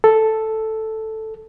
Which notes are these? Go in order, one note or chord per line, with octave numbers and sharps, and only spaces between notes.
A4